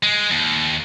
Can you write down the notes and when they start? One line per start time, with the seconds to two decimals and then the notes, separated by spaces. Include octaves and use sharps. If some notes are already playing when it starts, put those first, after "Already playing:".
0.03 G#3
0.31 D#2